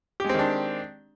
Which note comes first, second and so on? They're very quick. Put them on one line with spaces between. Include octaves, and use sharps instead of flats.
G4 G#3 C4 D#3 D4